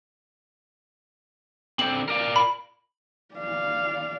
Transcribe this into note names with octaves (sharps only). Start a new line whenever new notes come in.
D3 C4 F#7
A#4 D5 F5
B5
D5 F5